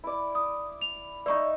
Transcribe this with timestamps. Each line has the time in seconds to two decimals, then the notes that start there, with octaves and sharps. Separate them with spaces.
0.04 E4 D5
0.35 D#6
0.81 F7
1.26 D#4 D5 E5 C#6